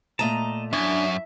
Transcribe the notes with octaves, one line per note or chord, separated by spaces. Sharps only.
A#2 A3 D#5 A5 A#5
F#2 D4 E4 E5 G#5